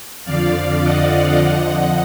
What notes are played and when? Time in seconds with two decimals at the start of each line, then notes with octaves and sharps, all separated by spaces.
0.25 F2 D3 F3 D5 F5
0.82 D#5 F#5
1.41 F2 D3 F3